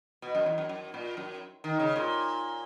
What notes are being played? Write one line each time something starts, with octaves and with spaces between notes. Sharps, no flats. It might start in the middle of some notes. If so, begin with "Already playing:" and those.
B2
F#2
E2
F#2
F#2
A#2
F#2
D#3
C#3
A#2